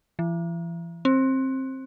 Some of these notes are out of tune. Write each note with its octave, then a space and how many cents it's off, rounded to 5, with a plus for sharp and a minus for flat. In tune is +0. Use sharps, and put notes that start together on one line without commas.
E3 +40
C4 +20